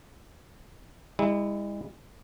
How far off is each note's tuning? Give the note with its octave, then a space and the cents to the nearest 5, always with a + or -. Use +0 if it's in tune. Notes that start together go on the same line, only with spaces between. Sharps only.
G#3 -45 E4 -20